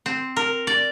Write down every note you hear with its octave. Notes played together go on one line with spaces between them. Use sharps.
C4
A#4
D5